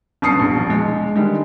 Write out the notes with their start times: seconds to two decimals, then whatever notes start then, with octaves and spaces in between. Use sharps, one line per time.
0.22 G1 F#2 A5 D#6 C7 C#7
0.35 E1 A#1
0.70 G#3
1.16 D3 D#3 G3 G#3